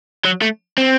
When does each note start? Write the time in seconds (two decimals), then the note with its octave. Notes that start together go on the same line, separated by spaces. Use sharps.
0.24 F#3
0.41 A3
0.78 C4